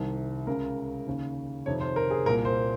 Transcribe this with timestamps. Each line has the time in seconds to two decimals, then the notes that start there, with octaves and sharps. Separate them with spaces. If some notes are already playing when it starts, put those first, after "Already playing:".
Already playing: C2 C3 D#3
0.47 C#2 C#3 A#4
1.07 D#2 C#3
1.66 F2 C3 D#3 C#5
1.80 C5
1.96 A#4
2.10 G#4
2.26 C2 A#2 A#4
2.45 C5